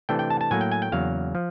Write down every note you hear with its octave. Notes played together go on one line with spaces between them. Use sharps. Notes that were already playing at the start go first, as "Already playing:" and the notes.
C3 E3 A3 D4 G5
G5
A5
A5
A2 F#3 A#3 G#5
G5
G#5
G5
E2 C#3 F#3 A#3 F5
F3